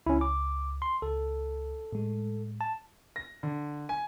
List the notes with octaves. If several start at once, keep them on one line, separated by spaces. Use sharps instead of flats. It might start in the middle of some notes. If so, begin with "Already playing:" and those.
C#2 C#4 E4
D6
C6
C#2 A4
A2 G#3
A5
A#6
D3
G#5